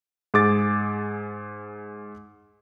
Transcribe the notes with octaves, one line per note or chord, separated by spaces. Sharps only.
G#2 G#4 D6 A6